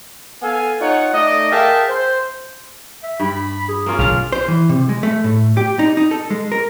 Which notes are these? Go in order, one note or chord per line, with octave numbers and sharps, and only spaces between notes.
B3 A4 F5 G#5
D#4 F4 C#5 F#5
A3 D#4 D5 D#5
G#4 A#4 E5 F5 G5 A5
C5
E5
G2 B5
G#4
A#3 C#4 F4
B1 D3 G#3 F6
C5
E3
C3
G#3
A3
A2
G4
D#4
D#4
A4
G#3
A#4